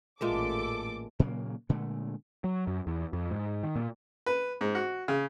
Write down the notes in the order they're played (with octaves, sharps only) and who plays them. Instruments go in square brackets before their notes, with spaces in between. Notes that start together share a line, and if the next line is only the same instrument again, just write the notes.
[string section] A1 A4 D6 [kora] A#2 G#3 E5
[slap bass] A#2 C#3 F#3 A#3
A#2 D3 G#3 A3
[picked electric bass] F#3
F#2
E2
F2
G#2
D#3
A#2
[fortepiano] B4
G#2
F#4
C#3